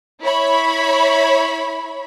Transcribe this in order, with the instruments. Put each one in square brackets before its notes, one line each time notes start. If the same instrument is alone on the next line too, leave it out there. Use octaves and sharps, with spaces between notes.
[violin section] E4 C#5 B5